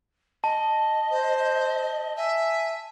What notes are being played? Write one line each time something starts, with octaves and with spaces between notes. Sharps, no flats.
D#5 A5
C5
E5 G#5